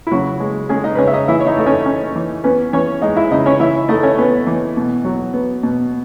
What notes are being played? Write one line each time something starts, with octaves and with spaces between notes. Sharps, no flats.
E4
C#3 F#3 F#4
G#3
G#3 C#4 G#4
D#4 D#5
B4
C#3 C#4 C#5
E5
D#4 D#5
E3 E4 E5
C#5
D#4 D#5
A3 D#5
C#4 C#5
C#4
E3
B3 C#4 B4
E3 C#4 C#5
G#3 D#4 D#5
E4 E5
C#3 D#4 D#5
C#4 C#5
E3 E4 E5
A3 D#4 D#5
C#4 C#5
B3 C#4 B4
E3
B2
F#3
B3
B2